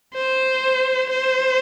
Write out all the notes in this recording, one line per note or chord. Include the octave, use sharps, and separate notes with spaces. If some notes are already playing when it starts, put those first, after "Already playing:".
C5
C5